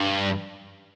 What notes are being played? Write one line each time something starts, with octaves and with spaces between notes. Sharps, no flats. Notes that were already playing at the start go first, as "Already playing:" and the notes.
Already playing: G2